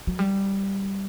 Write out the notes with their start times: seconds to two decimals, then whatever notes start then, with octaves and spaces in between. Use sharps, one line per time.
0.07 F#3
0.19 G3